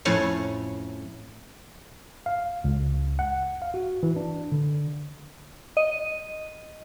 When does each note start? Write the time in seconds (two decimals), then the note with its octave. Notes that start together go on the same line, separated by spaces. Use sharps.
0.05 F2 A2 C#4 C#5
2.26 F5
2.64 C#2
3.19 F#5
3.62 F5
3.74 F#4
4.03 E3
4.16 D4
4.52 D3
5.77 D#5